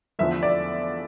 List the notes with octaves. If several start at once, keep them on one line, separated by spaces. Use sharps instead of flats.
E2 D3 F3 A3 E5
D5